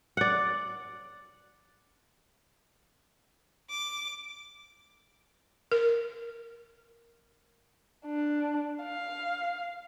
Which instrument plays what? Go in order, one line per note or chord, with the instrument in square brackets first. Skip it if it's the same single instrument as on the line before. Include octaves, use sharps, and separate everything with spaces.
[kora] D5 F#5
[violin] D6
[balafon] A#4
[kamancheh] D4
F5